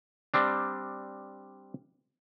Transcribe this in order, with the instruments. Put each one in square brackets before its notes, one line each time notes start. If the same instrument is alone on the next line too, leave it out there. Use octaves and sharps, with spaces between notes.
[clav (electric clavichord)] G3 C4 D4